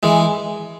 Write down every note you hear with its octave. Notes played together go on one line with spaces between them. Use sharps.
E3 G#3